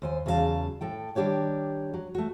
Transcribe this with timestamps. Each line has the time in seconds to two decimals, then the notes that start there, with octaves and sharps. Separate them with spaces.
0.02 D#2 C5 G#5
0.26 E2 C#3 F#3 C#4 F5 A5
0.81 A2 A4 G5
1.15 D#3 G3 D4 G4 C#5 D5
1.94 F#3
2.15 A3 F#4